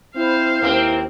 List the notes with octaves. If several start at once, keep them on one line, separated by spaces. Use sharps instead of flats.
C4 E4 C5 F5
D#2 A#3 C4